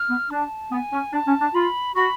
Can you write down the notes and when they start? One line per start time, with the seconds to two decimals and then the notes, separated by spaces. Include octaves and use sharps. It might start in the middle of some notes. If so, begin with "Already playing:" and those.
Already playing: F6
0.09 B3
0.31 D4 A5
0.71 B3 G#5
0.92 C#4
1.13 D4 A5
1.27 C#4
1.41 D4
1.55 F4 B5
1.95 F#4 B5